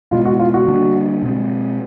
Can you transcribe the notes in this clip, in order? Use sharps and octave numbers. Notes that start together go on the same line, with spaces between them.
B2 G#3 B3 F4
F#4
F4
F#4
D3 G3 A#3 D4
B2 G#3 C4